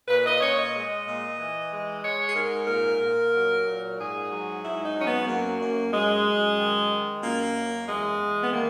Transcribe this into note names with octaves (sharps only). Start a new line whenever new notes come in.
A#2 B4
D#5
A#2 C#5
D#5
G#3
A#2
E3
G#3
G#3 C#5
G#4
G#2 A#4
A#2 A#4
A#2
F#3
A#2
G#2 G#4
F#3
G#2 E4
D#4
F#3 C#4
B3
F#2 A#3
F#2
F#2 G#3
F#2
D#3
D#3
F#2 A#3
F#2
E2 G#3
E2
B3
D#3 A#3